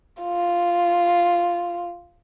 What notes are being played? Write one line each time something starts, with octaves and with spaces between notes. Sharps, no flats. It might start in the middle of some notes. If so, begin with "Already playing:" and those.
F4